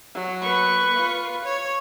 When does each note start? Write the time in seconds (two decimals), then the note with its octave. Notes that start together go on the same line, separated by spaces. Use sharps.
0.14 F#3
0.43 B4 C#6
0.96 F4
1.45 C#5